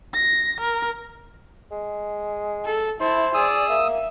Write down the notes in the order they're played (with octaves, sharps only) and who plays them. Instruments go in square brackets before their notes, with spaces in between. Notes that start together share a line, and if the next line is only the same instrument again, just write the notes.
[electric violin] A#6
A#4
[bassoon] G#3
[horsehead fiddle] A4
[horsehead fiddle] E4 A5 [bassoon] C5
[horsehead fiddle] G#4 D5 [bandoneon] D#6 E6
[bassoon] A#3 [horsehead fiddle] E5